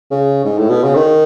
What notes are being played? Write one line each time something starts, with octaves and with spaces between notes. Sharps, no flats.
C#3
G#2
A2
B2
C#3
D#3